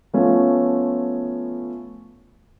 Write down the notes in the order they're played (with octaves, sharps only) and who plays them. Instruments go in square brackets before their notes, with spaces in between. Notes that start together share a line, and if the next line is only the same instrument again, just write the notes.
[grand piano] F3 A3 B3 C#4 F4